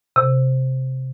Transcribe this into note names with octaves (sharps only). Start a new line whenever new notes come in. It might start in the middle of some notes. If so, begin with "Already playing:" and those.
C3